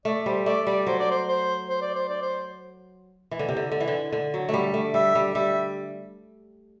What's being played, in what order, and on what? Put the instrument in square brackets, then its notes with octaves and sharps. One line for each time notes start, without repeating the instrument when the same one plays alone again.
[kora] A3 [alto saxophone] D5
[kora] G3 [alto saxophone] C5
[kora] A3 [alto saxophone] D5
[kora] G3 [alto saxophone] D5
[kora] F#3 [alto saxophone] C5
[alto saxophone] D5
C5
C5
C5
D5
C5
D5
C5
[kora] E3
D3
C3
D3
D3
E3
D3
D3
F#3
G3 A3
A3
[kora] G3 [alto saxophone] E5
[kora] G3
[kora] G3 [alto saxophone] E5